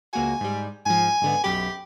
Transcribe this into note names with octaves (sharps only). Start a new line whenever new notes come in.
C#2 A#3 F#4 G#5
G#2 G3
G#2 F3 G#5
G#2 D3 B3
B1 F#2 G4 B5